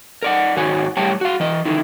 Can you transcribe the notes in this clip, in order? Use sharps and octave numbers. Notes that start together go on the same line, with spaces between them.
A#4 D5 F#5
G#2 D#3 F#4 C#5 G#5
A2 G3 G4 C#5 G5 A5
F#4 F5
E3 D#5
D3 D#3 D#4 E4